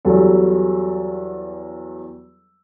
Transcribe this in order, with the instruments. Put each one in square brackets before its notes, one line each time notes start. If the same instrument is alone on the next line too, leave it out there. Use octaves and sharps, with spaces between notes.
[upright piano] E2 F#3 G3 A4